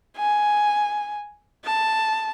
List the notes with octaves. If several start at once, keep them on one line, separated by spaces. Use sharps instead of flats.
G#5
A5